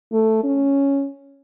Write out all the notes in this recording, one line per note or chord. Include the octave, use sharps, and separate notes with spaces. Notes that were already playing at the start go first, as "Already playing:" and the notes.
A3
C#4